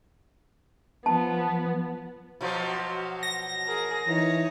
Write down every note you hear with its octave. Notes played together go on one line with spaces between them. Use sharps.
F3 B3 A5
B2 F3 F#3
A#6
G#4 A#4
E3 D#4 C#5